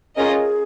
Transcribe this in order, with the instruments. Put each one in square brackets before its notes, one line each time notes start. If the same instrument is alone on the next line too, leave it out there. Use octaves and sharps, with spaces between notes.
[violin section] C#4 F4 A#4 D#5 [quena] G#4